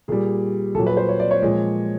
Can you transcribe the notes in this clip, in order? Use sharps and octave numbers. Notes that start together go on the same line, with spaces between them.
A#2 G3 G#4
A#2 F#3 A4
B4
C5
C#5
D5
C#5
A#2 F3 G#3